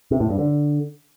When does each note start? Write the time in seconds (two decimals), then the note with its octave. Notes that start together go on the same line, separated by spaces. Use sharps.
0.11 C3
0.20 A2
0.30 G2
0.39 D3